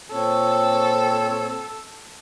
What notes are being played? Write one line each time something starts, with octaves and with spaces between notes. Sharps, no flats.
A#2 C4 A4 C#5